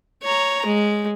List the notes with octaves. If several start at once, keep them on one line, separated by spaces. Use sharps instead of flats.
C#5 A#5
G#3